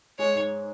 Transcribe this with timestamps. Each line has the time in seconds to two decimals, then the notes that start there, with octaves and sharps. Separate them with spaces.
0.18 G#3 C#5
0.35 G#2